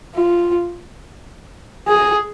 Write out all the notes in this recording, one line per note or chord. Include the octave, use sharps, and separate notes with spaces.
F4
G#4